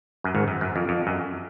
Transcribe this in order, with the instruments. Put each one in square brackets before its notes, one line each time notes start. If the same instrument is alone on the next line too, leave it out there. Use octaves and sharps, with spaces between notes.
[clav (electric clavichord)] F#2
G#1 G#2
F#2
F#2
F2
F2
F#2